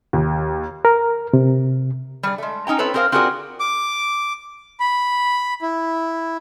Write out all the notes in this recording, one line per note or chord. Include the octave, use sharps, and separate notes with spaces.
D#2
A#4
C3
G3 G#4 D5
G#3 A3
C#4 D#4 G5 A#5
C4 E4 A4 B4 C#5
C4 G#4 A#4 C5 F5
C4 F4 F#4 G#4 A#4 D5
D6
B5
E4